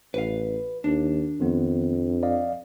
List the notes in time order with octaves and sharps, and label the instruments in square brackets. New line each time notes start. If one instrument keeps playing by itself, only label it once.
[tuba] A1 [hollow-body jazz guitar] B4 F5
[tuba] D#2 [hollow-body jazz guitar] D4
[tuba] F2 [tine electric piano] D#3 B3
[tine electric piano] D5 D#5 F5